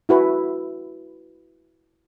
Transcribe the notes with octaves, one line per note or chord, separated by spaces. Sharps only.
E4 F#4 B4